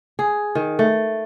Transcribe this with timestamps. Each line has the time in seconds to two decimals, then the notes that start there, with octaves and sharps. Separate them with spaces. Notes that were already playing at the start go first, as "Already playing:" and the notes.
0.19 G#4
0.55 D#3
0.79 A3